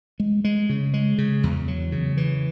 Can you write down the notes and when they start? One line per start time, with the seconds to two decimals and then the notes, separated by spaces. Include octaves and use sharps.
0.20 G#3
0.44 G#3
0.69 C#3
0.94 G#3
1.18 C#3
1.43 E2
1.68 F#3
1.92 C#3
2.17 E3